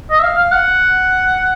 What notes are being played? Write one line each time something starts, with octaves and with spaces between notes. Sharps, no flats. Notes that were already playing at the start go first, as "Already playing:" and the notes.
D#5
E5
F5
F5
F#5